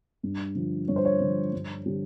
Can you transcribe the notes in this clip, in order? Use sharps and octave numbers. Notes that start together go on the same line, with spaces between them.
G2
D3 F3
G2 C#5
C5
C#5
D3 F3
G2
D3 G3